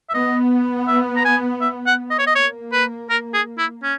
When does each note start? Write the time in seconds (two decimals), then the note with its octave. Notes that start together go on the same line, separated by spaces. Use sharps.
0.09 E5
0.13 B3 D#5
0.88 E5
1.16 A#5
1.25 G#5
1.61 E5
1.87 F#5
2.11 D#5
2.19 C#5
2.27 D#5
2.35 A#3 C#5
2.73 B4
3.10 A#4
3.34 G#4
3.58 E4
3.83 C#4